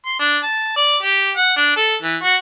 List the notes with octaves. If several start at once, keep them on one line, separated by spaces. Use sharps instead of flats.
C6
D4
A5
D5
G4
F#5
D4
A4
E3
F#4